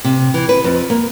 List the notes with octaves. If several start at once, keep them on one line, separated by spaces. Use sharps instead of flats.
C3
E3
B4
F2
A#3